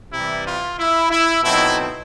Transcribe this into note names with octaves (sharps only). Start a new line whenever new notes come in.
C3 E3 G3 E4
F4
E4
E4
B2 F#3 A3 C4 D#4 E4